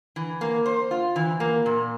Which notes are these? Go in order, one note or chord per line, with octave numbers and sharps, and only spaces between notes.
E3
A#3
C5
F4
E3
A#3
A#2